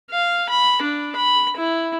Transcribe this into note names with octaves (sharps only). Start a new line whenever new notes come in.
F5
B5
D4
B5
E4